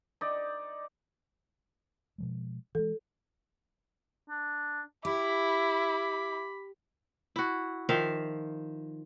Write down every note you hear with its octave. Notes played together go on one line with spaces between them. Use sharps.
D#4 D5
B2 F3 G#3
E3 F#3 G#3 A4
D4
E4 G4 B5 D6
E4 F#4
D#3 F3 E5 F5